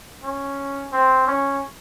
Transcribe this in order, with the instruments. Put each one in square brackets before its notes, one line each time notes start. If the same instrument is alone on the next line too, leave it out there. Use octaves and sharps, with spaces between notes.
[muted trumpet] C#4
C4
C#4